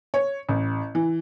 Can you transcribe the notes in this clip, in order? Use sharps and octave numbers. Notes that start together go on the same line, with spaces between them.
C#5
A1
E3